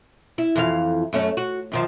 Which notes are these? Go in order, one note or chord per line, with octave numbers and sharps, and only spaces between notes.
E4
F2 E3 F5
F#2 A3 C#4
F#4
F#2 D#3 F3